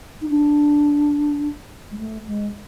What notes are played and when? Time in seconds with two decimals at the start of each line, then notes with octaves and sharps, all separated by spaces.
0.22 D#4
0.29 D4
1.91 G#3
1.98 A3
2.27 G#3